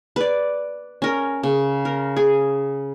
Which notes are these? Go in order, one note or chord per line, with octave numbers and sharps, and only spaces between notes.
B4 D5
C#4 A#4
C#3
A#4
G#4